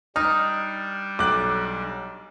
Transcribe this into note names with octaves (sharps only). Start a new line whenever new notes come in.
G3 D4 D#4 F6
B1 D6 F#6